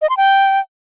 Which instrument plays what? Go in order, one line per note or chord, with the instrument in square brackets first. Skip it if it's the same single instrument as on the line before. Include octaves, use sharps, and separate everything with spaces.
[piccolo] D#5
C6
G5